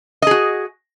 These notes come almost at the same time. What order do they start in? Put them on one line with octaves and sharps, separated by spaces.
D#5 G#4 F#4